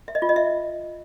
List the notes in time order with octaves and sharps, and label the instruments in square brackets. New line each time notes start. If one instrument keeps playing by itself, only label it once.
[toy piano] E5
D#5
F4
D#5
E5